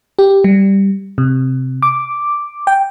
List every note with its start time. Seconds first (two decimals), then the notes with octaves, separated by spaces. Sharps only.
0.19 G4
0.44 G3
1.18 C3
1.83 D6
2.67 G5